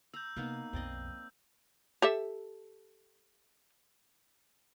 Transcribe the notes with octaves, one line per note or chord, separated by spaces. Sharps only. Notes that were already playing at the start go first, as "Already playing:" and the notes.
A#5 E6 G6
C3 A#3 B3 D#4
B1 F2 C4 D5 D#5
G4 A4 E5